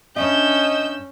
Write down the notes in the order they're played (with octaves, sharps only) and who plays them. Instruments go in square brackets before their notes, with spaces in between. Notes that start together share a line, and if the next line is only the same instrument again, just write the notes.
[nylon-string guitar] G2 D4 E5 [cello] C#4 [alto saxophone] D#5 [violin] E6 G6